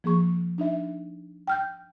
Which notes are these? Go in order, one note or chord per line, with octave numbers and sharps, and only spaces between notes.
F3 A#3 G#4 C#6
D4 D#4 E5
G5 F6 G6